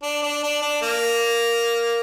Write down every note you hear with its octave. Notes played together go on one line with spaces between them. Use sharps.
D4
D4
D4
D4
A#3